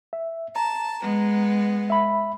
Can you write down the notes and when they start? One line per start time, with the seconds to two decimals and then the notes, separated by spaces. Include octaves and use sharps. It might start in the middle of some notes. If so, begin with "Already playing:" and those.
0.13 E5
0.56 A5 A#5
1.02 G#3 B3
1.90 E5 B5